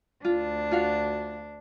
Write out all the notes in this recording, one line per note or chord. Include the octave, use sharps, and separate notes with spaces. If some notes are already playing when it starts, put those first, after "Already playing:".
D2 D4 F4
F4 F#4 F5